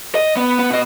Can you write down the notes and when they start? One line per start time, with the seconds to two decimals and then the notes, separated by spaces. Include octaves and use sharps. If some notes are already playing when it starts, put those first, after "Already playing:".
0.15 D#5
0.37 B3
0.59 B3
0.71 B2 D#5